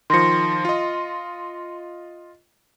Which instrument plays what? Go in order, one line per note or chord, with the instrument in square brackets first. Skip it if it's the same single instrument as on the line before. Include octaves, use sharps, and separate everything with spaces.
[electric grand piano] D#3 F3 [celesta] C6 A#6 C#7
[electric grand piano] F4 D#5